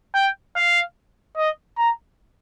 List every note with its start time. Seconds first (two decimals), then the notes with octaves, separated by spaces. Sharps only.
0.15 G5
0.56 F5
1.37 D#5
1.77 A#5